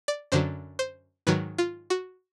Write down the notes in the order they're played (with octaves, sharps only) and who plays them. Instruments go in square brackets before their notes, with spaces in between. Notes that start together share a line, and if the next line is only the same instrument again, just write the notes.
[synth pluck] D5
F#2 D3 F#3 C5
C5
G#2 D#3 F#3 B4
F4
F#4